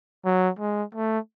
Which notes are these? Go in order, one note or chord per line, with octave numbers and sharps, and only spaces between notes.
F#3
G#3
A3